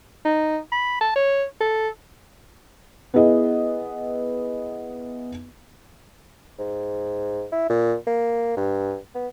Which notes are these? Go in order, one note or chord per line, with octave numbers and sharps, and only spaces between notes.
D#4
B5
A5
C#5
A4
B3 E4 G#4 D#5
G#2
E4
A#2
A#3
G2
B3